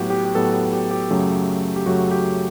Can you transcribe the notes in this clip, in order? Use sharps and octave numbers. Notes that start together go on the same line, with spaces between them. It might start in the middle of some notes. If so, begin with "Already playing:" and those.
Already playing: A2 F#3 B3 F#4 G4
G4
G4
A2 F#3 B3 A4
F#4
G4
G4
F#2 C#3 F#3 A3
G4
F#2 C#3 F#3 A3 F#4
G4